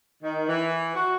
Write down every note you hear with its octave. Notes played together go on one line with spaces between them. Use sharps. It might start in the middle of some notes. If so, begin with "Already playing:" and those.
D#3
E3
F#4